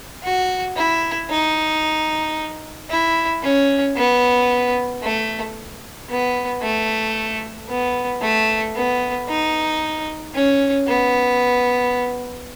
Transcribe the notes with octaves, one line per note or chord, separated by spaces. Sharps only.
F#4
E4
D#4
E4
C#4
B3
A3
B3
A3
B3
A3
B3
D#4
C#4
B3